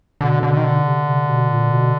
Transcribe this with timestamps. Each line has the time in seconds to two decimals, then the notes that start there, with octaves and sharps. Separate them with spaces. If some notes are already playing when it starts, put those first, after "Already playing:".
0.21 B2 D3
0.43 D3
0.57 D#3
0.64 D3
0.85 C3
1.07 C3
1.28 B2
1.50 A#2
1.72 B2